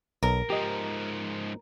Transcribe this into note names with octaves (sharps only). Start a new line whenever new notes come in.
B1 A#4
G#2 F3 G4 D#5